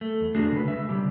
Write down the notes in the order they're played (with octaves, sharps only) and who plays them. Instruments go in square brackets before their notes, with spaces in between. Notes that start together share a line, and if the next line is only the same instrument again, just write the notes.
[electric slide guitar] A3
E2
A3 D4 F#4 G#4
C#3 B4
G#3 E5
C#3 G3 G4